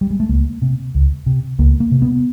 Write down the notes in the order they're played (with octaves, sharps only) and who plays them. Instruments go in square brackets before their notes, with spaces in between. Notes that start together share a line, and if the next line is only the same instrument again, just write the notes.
[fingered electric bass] G3
G#3
A3
C#2 A#3
C3
C#2
C3
C#2 A#3
A#3
C3
B3